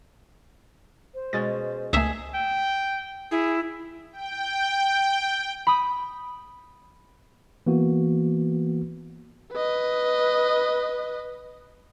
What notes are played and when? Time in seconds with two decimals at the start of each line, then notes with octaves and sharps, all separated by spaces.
1.14 C5
1.33 B2 G#3 C#4 A6
1.93 C#2 A3 G#4 E5
2.34 G5
3.31 E4 G#4
4.13 G5
5.67 B5 D#6
7.67 E3 A#3 B3 F#4
9.53 B4 D#5